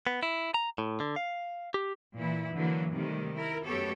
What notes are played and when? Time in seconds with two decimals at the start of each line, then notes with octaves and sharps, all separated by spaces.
0.07 B3
0.23 E4
0.54 A#5
0.78 A2
1.00 D3
1.16 F5
1.74 G4
2.15 A#2 E3 E4
2.55 D3 E3 F#3 A#3
2.91 C3 D#3 G3 A3
3.35 E4 A#4
3.64 F#2 A3 B3 G4 A4 C#5